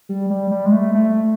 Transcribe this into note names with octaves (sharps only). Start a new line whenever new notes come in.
G3
G3
G3
G#3
A3
A3